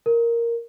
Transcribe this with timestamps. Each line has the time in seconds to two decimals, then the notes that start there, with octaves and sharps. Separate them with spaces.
0.06 A#4